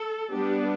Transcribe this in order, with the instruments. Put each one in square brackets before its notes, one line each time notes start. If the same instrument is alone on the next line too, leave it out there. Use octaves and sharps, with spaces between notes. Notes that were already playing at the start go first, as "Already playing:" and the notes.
Already playing: [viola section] A4
G3 B3 D4 G4